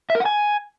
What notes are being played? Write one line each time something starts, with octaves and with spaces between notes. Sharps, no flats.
E5
A#4
F#5
G#5